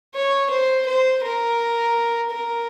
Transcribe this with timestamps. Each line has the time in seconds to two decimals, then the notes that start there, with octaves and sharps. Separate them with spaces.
0.15 C#5
0.50 C5
0.87 C5
1.23 A#4
2.31 A#4